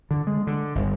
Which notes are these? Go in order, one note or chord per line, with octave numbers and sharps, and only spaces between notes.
D3
G#3
D3
G1